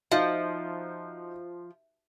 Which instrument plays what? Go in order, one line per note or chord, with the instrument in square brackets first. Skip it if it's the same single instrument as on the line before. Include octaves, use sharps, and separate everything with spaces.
[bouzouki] F3 [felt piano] D#4 F#4 [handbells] E5 [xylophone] F5